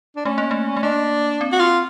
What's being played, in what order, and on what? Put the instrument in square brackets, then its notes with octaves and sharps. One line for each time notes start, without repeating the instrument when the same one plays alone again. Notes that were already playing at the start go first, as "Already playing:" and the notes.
[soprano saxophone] D4
[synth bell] A3 [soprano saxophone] C#4
[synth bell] A#3
A3
A3
[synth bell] A#3 [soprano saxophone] D4
[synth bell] C4
[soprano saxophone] F#4
F4